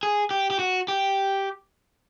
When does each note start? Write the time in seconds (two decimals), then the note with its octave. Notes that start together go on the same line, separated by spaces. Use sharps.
0.03 G#4
0.31 G4
0.51 G4
0.59 F#4
0.88 G4